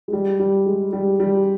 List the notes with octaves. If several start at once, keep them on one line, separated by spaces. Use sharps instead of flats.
G#3
G3
G3
G#3
G3
G3